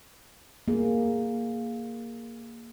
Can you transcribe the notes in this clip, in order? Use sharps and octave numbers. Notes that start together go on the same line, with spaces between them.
A#3 G#4